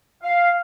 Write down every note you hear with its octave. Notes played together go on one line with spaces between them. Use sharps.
F5